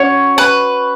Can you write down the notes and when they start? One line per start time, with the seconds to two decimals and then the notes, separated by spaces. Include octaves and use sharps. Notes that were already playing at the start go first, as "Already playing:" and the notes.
Already playing: C#4 F#4 C#5
0.38 B4